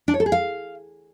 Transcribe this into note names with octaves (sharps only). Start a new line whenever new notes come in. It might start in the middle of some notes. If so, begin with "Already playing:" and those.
D4
C#5
A4
G#4
F5